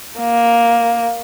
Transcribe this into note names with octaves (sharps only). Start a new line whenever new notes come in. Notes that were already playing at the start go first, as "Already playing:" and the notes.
A#3